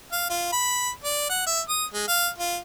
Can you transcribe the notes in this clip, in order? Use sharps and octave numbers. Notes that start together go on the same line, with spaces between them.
F5
F4
B5
D5
F#5
E5
D#6
G#3
F5
F4